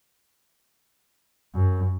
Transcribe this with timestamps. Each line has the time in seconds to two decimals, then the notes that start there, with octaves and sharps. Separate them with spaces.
1.55 F#2